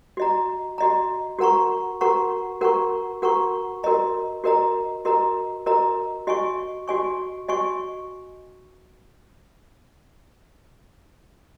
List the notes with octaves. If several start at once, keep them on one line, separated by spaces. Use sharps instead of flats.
F#4 D#5 A#5
F#4 D#5 A#5
F#4 A#4 F#5 A#5 C#6
F#4 A#4 F#5 A#5 C#6
F#4 A#4 F#5 A#5 C#6
F#4 A#4 F#5 A#5 C#6
F#4 A#4 D#5 A#5
F#4 A#4 D#5 A#5
F#4 A#4 D#5 A#5
F#4 A#4 D#5 A#5
F#4 D#5 G#5 C#6
F#4 D#5 G#5 C#6
F#4 D#5 G#5 C#6